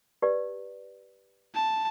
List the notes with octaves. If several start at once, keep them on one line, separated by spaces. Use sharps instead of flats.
G4 B4 D5
A5